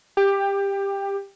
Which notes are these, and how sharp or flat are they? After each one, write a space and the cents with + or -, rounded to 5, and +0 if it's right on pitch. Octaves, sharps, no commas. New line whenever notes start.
G4 +15